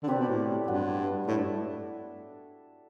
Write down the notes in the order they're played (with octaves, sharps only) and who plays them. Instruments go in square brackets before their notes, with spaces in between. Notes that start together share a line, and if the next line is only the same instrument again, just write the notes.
[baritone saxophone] D3
[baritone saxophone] C3 [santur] C4 G4 B4 D5
[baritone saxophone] B2
A2
[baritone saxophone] G2 [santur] F#3 B3 D4
[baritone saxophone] A2 [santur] E4 A4 E5
[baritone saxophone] G2